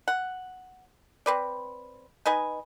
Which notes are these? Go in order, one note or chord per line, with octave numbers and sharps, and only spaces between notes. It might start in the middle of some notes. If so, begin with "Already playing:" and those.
F#5
C4 B4 D5
D#4 B4 D#5 G#5